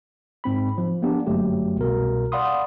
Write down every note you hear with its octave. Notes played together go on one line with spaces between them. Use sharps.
G#2 C4 B5
F3
A#3 B3 D4 G4
G1 F#2 F#3 A3 G4
C2 B2 A#4
D5 F5 F#5 B5 C6 D#6